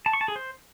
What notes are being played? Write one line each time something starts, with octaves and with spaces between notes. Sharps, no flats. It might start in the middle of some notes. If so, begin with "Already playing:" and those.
A5
C#6
A5
G#4
C5